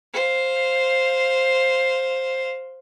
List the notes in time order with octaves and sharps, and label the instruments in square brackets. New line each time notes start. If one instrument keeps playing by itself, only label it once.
[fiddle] C5 F5